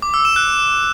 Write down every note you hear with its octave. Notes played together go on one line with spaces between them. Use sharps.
D6
E6
E7
F#6